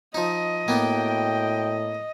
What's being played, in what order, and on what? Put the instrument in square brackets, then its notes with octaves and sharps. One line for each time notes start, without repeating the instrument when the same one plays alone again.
[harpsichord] F3 D#4 [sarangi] D#5
[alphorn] A2 [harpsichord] A#3 B3 [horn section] F#4 G5